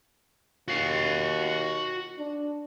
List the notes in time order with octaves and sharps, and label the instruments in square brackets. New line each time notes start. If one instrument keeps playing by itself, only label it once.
[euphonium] D#2 [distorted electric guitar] F#4 F5
[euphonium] D4